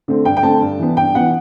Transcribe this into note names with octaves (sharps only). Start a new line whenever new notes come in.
D3 A3 C4
G2 G5
G5
D3 A3 C4 A5
G2
E3 B3
G2 G5
E3 B3 F#5